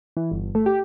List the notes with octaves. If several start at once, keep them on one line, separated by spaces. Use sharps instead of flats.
E3
G1
A3
G4